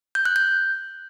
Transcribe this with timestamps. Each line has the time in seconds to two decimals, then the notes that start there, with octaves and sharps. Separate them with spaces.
0.15 G6
0.25 F#6
0.36 G6